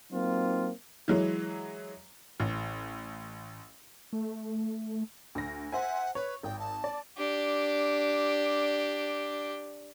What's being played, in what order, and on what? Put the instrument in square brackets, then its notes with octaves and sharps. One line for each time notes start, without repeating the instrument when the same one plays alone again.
[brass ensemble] F#3 A#3 C4 D#4 F4
[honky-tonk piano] E3 F#3 G#3
A1
[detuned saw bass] A3
[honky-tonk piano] D2 A#6
[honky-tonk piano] C5 E5 G#5 [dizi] F#5
[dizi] B4 [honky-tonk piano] C#5
[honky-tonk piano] G#1 [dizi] G5
[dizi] A5
[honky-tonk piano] D5
[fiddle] D4 G4